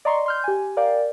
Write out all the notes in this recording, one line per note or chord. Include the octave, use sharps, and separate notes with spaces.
D5 D#5 A#5 C6 C#6
C6 F6 G6
G4 G#5
A#4 D5 F5 G5